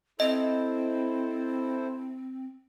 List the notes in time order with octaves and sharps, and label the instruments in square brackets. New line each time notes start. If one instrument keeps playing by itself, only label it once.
[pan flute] C4 [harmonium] E4 A4 C5 [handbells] D#5